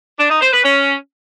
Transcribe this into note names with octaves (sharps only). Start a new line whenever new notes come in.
D4
D#4
C5
B4
C#4